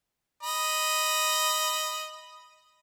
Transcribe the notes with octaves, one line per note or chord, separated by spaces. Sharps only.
D#5 B5